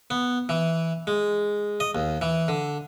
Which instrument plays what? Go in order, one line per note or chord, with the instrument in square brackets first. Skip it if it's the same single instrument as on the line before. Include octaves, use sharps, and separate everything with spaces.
[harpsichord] B3
E3
G#3
D#5
D#2
E3
D3